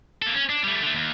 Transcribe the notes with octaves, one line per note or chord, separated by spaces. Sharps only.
A#3 A4
C#4
D4
G3 A3
D3 A3
D#2